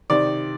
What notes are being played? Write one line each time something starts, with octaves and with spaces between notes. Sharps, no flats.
C3 D#3 D5